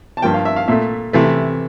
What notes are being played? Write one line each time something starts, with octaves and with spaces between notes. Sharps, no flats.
A5
G2 F3 A#3 G5
F5
E5
F5
A#2 A3 E5
C3 E3 A3